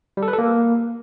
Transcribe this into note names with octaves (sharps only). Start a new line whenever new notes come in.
G3
A4
B4
A4
A#3